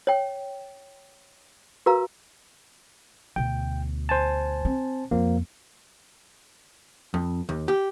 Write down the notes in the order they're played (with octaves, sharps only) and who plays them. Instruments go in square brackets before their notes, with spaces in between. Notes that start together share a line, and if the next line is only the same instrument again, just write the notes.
[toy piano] C#5 G5
F#4 A#4 B4 F5 A#5
[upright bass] D2 B2 [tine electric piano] G5
[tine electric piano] C5 G#5 A5
[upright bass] C4
[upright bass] F2 [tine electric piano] F3 A#3
[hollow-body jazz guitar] F2
D#2
G4